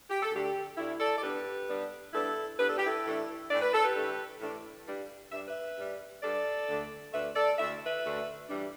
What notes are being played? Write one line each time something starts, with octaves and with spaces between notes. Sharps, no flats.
G4
A4
D2 D3 A3 D4 G4
D2 D3 A3 D4 E4
A4 D5
D5
G2 G3 B3 D4 G4 B4
G2 G3 B3 D4
G2 G3 B3 D4 E4 A4
G2 G3 B3 D4 B4
A4
G4
E4 A4
A2 E3 A3 D4
A2 E3 A3 D4 D5
B4
A4
G4 B4
A2 E3 A3 D4
A2 E3 A3 D4
G2 G3 D4
G2 G3 D4 E5
B4 E5
G2 G3 D4
G2 G3 D4 A4 D5
D2 D3 A3 D4
D2 D3 A3 D4 B4 E5
A4 D5
D2 D3 A3 D4 E5
B4 E5
D2 D3 A3 D4
G2 E3 G3 D4